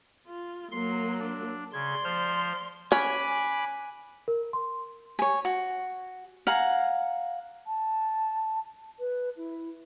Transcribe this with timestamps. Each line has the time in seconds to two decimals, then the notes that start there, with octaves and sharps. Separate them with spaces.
0.27 F4
0.72 F#3 A#3 C6
1.19 D4
1.73 C#3 D5 C6 G#6
2.04 F3 C5 F6
2.92 C#4 G#5 B5 D6 F#6
4.28 A#4
4.53 C6
5.19 C#5 G#5
5.45 F#4
6.47 F5 F#5 G#5 A#5
7.66 A5
8.99 B4
9.36 E4